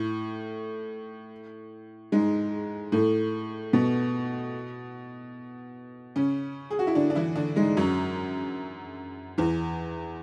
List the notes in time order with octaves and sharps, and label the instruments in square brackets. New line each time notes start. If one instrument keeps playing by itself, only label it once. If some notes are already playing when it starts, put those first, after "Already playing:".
Already playing: [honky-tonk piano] A2 A3
G#2 G#3
A2 A3
B2 B3
C#3 C#4
G#4
F#4
E4
D3 D4
D4
E3 E4
D3 D4
G#2 G#3
F#2 F#3
E2 E3